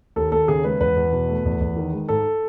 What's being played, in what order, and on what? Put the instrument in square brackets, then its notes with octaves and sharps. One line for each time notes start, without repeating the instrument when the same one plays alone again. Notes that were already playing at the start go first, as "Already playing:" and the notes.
[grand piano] D#2 A4
D#2 A4
C#3 G#4
G#3 B4
E2 B4
E2
B2
A3
E2
E2
D#3
G#3
G#2 A4